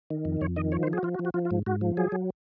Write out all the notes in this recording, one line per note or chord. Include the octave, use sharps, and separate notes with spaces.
D#3
F2
F2 C#5
D#3 D#5
F3 C#5
C5
F3
G#4
F#4
F3 F4
F#4
F3
F#4
F3 F4
F4
G#2
G#2 F#4
F3
F#3 G#4
F#3